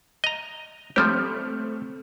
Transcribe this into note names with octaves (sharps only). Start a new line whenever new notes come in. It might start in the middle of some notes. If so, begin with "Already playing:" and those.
D#5 A#5
F3 G3 A3 C4 G4